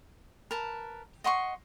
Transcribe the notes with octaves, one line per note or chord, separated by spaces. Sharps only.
A#4 B4 A5
D#5 F#5 C6 C#6